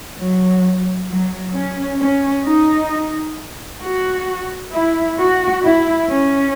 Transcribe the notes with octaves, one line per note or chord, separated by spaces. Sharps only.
F#3
F#3
C#4
C#4
D#4
F#4
E4
F#4
E4
C#4